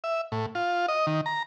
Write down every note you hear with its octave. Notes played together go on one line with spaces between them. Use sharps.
E5
A2
F4
D#5
D#3
A#5